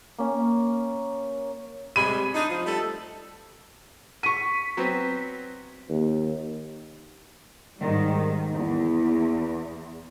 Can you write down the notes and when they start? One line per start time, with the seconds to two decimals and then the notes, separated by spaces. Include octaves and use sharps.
0.19 A#3 C#4
1.96 C3 G3 G#3 B5 D#7
2.34 D4 D#4
2.49 F3
2.66 G3 A3 A4
4.23 C#6 B6 D#7
4.77 F#3 B3 C4
5.90 D#2
7.80 G#2 D#3 G3
8.55 E2